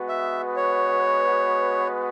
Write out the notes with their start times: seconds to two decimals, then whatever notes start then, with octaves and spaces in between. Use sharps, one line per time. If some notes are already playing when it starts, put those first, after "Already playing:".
Already playing: G#3 B3 F#4 B4
0.09 E5
0.56 C#5